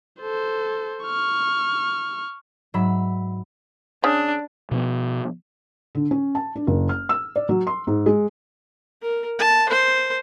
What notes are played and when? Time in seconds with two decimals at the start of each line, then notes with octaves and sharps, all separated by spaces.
0.21 A4 C5
1.04 C#6 F6
2.74 G#2 F#3 E5 B5
4.04 C#3 D4
4.71 B2 F3 B3
5.95 D3
6.11 C#4
6.35 A5
6.56 D4
6.67 F#1
6.89 F6
7.09 E6
7.36 D5
7.49 F#3
7.67 C6
7.87 G#2
8.06 G#3
9.02 A#4
9.39 A5
9.69 C5